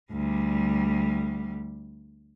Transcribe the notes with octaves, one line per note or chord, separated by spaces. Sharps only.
D2 G3